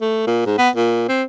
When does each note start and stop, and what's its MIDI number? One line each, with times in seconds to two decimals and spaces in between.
0.01 0.25 57
0.27 0.43 46
0.46 0.58 44
0.58 0.69 59
0.76 1.04 46
1.08 1.23 60